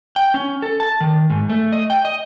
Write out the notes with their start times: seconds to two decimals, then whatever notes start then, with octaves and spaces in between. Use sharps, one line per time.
0.16 G5
0.34 C#4
0.62 A4
0.80 A5
1.00 D#3
1.30 G#2
1.50 A3
1.73 D#5
1.90 G5
2.05 D#5